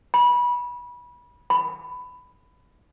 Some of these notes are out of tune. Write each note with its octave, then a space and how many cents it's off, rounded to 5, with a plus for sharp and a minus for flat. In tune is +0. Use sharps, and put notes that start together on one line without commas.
B5 -25
B5 +15